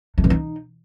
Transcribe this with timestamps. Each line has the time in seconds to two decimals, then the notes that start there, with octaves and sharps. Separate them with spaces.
0.18 A3
0.24 E3
0.30 D#4